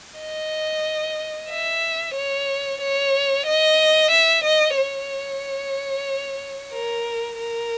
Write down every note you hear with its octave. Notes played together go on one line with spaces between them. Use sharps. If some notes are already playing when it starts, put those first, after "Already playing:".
D#5
E5
C#5
C#5
D#5
E5
D#5
C#5
A#4
A#4